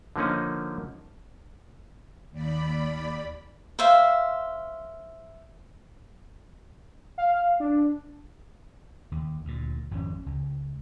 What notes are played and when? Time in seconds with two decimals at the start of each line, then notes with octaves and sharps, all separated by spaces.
0.16 D3 F3 A#3 C#4 D#4
2.31 D#2 D5 B5
3.79 C5 E5 F5
7.18 F5
7.60 D4
9.12 D#2
9.45 D2 A#2
9.91 G#1 F2 G#2 C#4
10.26 C#2